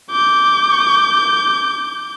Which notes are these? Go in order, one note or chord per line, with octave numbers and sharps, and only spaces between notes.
D6 G6